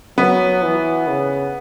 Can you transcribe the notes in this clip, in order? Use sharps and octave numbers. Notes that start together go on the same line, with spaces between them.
F#3 B3
E3
C#3